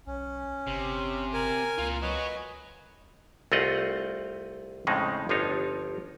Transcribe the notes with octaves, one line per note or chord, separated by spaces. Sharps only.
B1 C#4
G1 C3
A#4 G#5
C#2 A#3 F4
F#4 B4 C#5 D#5 G#5
C2 A3 C4 F4 D#5 F#5
F2 A2 C#3 G#3 C4 D#4
G1 F3 D4 D#4 C#5